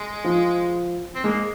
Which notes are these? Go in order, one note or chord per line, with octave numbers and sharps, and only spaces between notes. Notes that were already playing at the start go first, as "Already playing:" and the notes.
Already playing: G#3
F3
C4
G#3 A#3